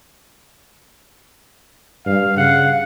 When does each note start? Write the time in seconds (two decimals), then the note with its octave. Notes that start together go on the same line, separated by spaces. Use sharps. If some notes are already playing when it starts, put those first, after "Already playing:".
2.06 G2 F5
2.37 C#3 F5 F#5